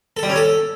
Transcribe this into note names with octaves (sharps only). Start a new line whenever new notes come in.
A4
G3
C#4
A4